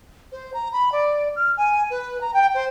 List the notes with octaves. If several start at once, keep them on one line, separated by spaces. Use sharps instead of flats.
C5
A#5
B5
D5
F6
G#5
B4
A#5
G5
C5